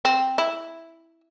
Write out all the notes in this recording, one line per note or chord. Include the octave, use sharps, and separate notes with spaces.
C4
E4